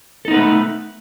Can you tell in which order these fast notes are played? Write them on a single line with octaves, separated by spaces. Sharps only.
A4 D#4 B3 B4 A3